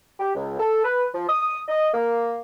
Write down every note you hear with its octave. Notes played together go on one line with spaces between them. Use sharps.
G4
C#2
A4
B4
F3
D#6
D#5
A#3